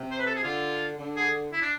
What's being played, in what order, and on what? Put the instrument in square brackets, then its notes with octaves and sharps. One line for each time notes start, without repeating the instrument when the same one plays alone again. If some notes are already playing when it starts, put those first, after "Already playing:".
Already playing: [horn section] C3
[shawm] C5
B4
A4
G#4
[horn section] D3 [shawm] F4
[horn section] D3
[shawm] G#4
E4
D4